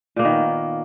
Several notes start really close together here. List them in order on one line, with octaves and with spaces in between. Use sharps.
A#2 A#3 B3 D#3